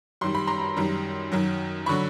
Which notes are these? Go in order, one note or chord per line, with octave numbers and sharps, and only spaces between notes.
F#2 D#3 G3 C6
B5
A#5 C6
F#2 D#3 G3
F#2 D#3 F#3
D3 F#3 B5 C#6